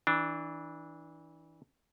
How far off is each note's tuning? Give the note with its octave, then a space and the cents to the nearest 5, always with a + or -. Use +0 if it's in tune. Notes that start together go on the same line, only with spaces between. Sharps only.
E3 -25 D4 +0